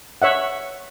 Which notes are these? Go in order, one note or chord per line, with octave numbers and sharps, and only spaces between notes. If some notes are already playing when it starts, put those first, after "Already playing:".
C#5 E5 F#5